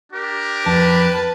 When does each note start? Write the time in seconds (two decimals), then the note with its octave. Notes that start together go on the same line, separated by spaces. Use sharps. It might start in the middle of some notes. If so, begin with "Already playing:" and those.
0.13 D4 G4 A#4
0.66 F2 B4 A5